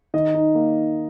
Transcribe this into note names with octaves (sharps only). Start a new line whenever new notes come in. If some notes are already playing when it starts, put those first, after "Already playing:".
D#3 D#5
D#4
A#3